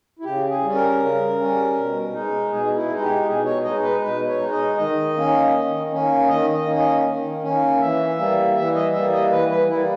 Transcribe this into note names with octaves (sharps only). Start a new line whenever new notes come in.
E4
C#3 G4
G#4
G3
C#4
A#4
C#3
G3 C#4
B2
G#3 D#4
B2 G#4
E4
G#3 D#4
G4
B2 G#4
C#5
G#3 D#4 D#5
B4
B2 B4
C#5
G#3 D#4
D#5
D#3 D#5
A#3 C#4
D#3
A#3 C#4
D#3 D#5
D#5
A#3 C#4
D#5
D#3
A#3 C#4
E3 E5
G3 A#3
E3 E5
D#5
G3 A#3 E5
D#5
E3 B4
B4
G3 A#3 E4